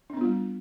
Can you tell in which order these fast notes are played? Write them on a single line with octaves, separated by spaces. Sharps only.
D4 C4 B3 F4 G3